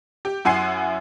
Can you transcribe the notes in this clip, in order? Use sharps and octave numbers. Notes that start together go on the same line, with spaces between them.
G4
F#2 E4 F#5 G#5 C6 C7